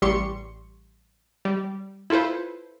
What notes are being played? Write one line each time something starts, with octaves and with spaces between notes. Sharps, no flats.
A1 G3 G4 C6 C#6 C#7
G3
E4 F4 A4 B4 C5